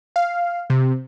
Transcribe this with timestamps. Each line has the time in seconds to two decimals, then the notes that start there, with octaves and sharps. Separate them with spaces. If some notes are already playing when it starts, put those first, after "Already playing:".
0.16 F5
0.70 C3